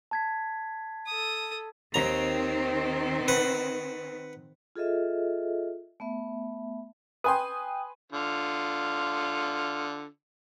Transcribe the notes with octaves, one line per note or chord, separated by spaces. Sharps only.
A5 G#6 B6
A4 D#6
D#2 D#3 C4 A#5
B4 F#5
F4 G#4 A4 D#5 E5
A3 B3 E5
B4 G5 G#5 C6 D#6
D3 F4